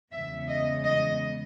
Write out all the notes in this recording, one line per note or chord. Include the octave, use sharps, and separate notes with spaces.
E2 C#3 G#3 B3 E5
D#5
D#5